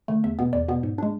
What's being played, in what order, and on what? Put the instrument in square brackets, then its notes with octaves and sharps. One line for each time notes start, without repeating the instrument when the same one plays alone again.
[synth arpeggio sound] D3 A3
E2 E5
B2 B3
E2 D5
B2 B3
G#2
G#3 D4